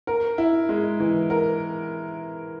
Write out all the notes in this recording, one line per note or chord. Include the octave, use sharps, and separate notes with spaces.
A#4
E4
G#3
E3
A#4